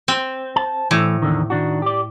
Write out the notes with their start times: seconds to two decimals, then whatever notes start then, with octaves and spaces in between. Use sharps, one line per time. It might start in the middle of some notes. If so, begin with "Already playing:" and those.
0.08 C4
0.56 A5
0.91 A2 E3 A3
1.22 E2 D3 D#3
1.50 D#3 D4 F#4
1.82 G4 D5